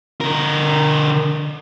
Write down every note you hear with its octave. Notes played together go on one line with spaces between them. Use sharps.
D3 A#4